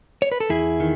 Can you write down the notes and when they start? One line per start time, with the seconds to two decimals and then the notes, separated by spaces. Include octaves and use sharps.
0.22 C#5
0.32 B4
0.40 A4
0.49 E2 E4 G#4
0.80 D#3